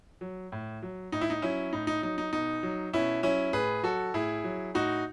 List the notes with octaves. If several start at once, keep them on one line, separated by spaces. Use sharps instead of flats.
F#3
A2
F#3
A2 D#4
E4
D#4
F#3 C#4 E4
A2 D#4
D#4
F#3 D#4
D#4
B2 D#4
F#3
B2 C#4 E4
F#3 C#4 E4
A2 G#4 B4
F#3 F#4 A4
A2 E4 G#4
F#3
A2 D#4 F#4